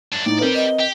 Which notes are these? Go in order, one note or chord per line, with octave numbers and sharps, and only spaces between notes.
F#2 D4
A2 D#4 D5
C4 G4 A#4 B4 D5
D#5
G4